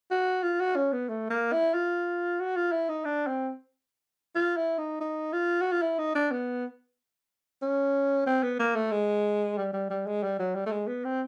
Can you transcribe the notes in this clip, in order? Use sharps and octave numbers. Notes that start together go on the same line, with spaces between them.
F#4
F4
F#4
C#4
B3
A3
A#3
E4
F4
F#4
F4
E4
D#4
D4
C4
F4
E4
D#4
D#4
F4
F#4
F4
E4
D#4
D4
B3
C#4
C4
B3
A#3
A3
G#3
G3
G3
G3
G#3
G3
F#3
G3
A3
G#3
B3
C4